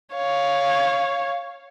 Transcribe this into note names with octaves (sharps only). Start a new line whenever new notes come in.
C#5 F5